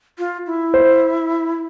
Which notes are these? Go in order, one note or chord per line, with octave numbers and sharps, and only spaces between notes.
F4
E4
C5